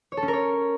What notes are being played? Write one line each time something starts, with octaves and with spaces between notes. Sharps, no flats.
C#5
A4
C#4
A#4
C#5